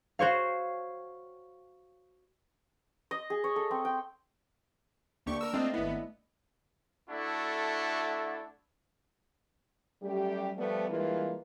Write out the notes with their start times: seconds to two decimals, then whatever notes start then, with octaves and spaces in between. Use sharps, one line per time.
0.19 F#4 C5 C#5 F5
3.11 D#5
3.30 G#4
3.44 C#5
3.56 A4
3.71 C4
3.85 G5
5.26 D2 A#3 D4 G4 C#6
5.41 A#4 E6
5.53 A3 C4 D4 F4 D#5
5.74 G#1 B3 E4
7.10 A3 D4 E4 F#4 A4
10.03 F#2 G3 A3 G4
10.57 F3 G3 A3 B3
10.89 G2 E3 G#3 A#3 F4 B4